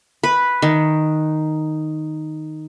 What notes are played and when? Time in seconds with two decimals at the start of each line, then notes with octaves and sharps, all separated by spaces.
0.23 B4
0.62 D#3